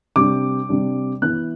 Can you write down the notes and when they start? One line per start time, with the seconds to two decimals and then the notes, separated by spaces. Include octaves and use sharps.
0.16 C3 G3 D4 D6
0.69 C3 G3 D4
1.22 E3 B3 E4 F#6